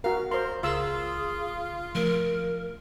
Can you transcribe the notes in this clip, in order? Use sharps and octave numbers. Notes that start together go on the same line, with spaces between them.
F#4 A#4 F5
A#4 C5 C6
C#2 F4 G#4 C6 E6
F3 A3 A#4